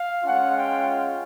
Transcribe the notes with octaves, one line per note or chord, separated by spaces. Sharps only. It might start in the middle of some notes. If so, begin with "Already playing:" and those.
Already playing: F5
G#3 C#4 F4 F#5
G5